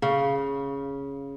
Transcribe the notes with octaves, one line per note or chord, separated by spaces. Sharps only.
C#3